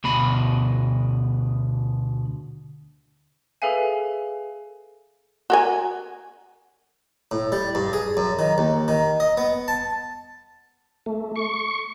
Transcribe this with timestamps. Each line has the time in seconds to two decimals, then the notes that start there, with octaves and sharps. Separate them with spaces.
0.04 D2 B2 B5
3.62 G#4 A4 B4 E5 F5 G#5
5.50 F#4 A#4 G#5
7.31 A2
7.52 G3
7.75 G2
7.93 G#4
8.17 F#2
8.39 D#3
8.58 D#2
8.88 D#3
9.20 D#5
9.37 B3
9.68 A5
11.06 A3
11.36 C#6